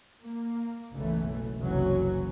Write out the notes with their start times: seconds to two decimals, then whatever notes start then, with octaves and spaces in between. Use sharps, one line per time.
0.21 A#3
0.95 F#1 B1 E3 A3
1.60 F#1 C2 E3 F#3 C#4